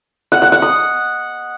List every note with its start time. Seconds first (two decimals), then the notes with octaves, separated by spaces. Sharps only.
0.32 F#5
0.42 F#5
0.52 F#5
0.62 D#6